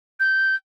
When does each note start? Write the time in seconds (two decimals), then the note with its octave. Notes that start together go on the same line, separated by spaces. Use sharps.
0.20 G6